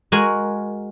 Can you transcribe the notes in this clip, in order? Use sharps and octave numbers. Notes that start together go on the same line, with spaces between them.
G#3 F#4 A#4 G#5